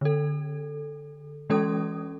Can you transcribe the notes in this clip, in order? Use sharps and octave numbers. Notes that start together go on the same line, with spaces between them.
D3 A4
E3 G#3 C#4 A4 D#6